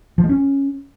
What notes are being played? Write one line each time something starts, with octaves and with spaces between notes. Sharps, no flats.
F3
G#3
C#4